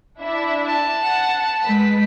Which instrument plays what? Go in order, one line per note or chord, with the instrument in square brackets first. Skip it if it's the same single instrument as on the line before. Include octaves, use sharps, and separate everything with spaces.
[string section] D4 E4 E5
[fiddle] A5
[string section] F#5
G#3 B4 B6